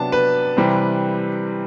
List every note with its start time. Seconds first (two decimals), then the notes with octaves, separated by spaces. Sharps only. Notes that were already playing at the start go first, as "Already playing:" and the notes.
Already playing: C3 F#3 B3 D4 A5
0.12 B4
0.57 C3 E3 G3 C4